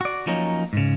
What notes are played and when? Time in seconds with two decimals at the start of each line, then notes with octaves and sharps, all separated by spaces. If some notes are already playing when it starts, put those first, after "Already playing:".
0.01 F#4 D5
0.27 F3 F#3 A#3 C#4 D#4
0.73 G#2 C#3